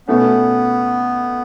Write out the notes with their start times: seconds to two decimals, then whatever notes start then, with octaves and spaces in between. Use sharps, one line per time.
0.08 B2 A3 B3 C#4